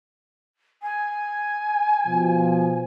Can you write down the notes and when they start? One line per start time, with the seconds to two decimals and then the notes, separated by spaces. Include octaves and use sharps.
0.83 G#5
2.07 B2 F3